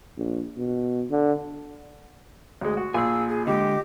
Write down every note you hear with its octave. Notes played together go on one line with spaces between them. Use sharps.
A#1
B2
D3
D2 G#3
F#4
A#1 A#2 G#4 G#5 E6
G#4
D3 G#3 G4 D#5 D6